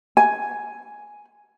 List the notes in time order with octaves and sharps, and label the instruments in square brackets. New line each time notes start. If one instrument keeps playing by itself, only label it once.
[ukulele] G#5